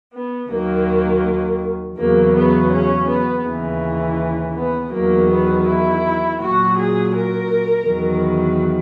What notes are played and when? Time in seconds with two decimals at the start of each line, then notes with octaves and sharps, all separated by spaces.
0.13 B3
0.49 D#2 D#3 F#3 A#3
1.97 E2 C#3 F#3 A#3
2.34 B3
2.71 C#4
3.08 B3
3.45 D#2 C#3 E3
4.55 B3
4.92 E2 D#3 F#3 A#3
5.29 B3
5.66 E4
6.39 A#2 F#3 F#4
6.76 G#4
7.13 A#4
7.86 E2 D#3 F#3